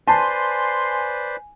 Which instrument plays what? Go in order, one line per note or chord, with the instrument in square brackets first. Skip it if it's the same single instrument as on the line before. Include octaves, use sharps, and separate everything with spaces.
[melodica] B4 C5 D5 [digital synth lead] G#5 [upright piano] A5 [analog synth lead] C6